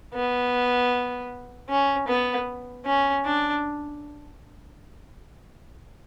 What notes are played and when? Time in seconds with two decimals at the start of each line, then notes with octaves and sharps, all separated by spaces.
0.14 B3
1.69 C#4
2.08 B3
2.85 C#4
3.24 D4